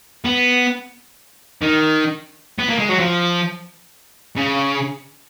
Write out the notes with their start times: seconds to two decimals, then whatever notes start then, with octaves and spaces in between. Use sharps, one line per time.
0.25 B3
1.62 D#3
2.59 B3
2.70 A#3
2.79 G#3
2.89 F#3
3.00 F3
4.37 C#3